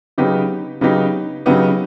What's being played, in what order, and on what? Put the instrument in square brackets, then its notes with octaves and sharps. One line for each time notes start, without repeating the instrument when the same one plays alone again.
[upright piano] C#3 F#3 B3 D#4 G4
C#3 F#3 B3 D#4 G4
C#3 F#3 B3 D#4 G4